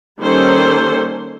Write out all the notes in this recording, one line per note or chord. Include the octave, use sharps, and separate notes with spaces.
D#3 G3 A#3 C#4 A4 C5